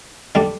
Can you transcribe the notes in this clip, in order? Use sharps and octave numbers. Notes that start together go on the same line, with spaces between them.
D3 G3 D4